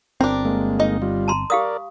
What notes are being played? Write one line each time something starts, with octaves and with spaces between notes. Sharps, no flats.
G1 C4 D4 A#4
G#3 A#3
D#4 D#5
G3 F4
A5 A#5 C6
G4 A#4 D5 F5 D#6